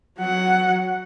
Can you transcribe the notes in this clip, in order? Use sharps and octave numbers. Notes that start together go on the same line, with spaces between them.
F#3 F#5